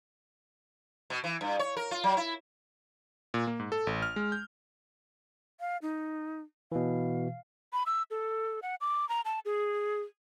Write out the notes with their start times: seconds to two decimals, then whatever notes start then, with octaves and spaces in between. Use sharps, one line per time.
1.10 B2
1.24 E3
1.41 G2
1.59 C#5
1.77 A#4
1.91 F4
2.04 F#3
2.17 E4
3.34 A#2
3.47 A#3
3.60 G#2
3.72 A4
3.87 A1
4.02 F6
4.16 G#3
4.32 G6
5.60 F5
5.82 D#4
6.72 B2 E3 F5
7.73 B5
7.86 E6
8.11 A4
8.62 F#5
8.81 D6
9.09 A#5
9.25 A5
9.45 G#4